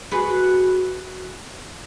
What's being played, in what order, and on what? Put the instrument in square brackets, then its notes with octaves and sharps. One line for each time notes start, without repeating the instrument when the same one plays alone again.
[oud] F#4 G#4 B4